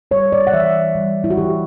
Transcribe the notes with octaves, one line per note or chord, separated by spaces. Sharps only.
G3 C#5
D5
F#5
E3 E5
G3
E4
F#4
E3 G4